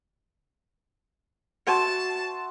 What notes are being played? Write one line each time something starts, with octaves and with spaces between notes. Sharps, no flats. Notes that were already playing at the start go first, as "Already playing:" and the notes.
F#4 C5 E5 A5